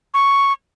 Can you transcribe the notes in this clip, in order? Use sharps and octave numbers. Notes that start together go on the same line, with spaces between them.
C#6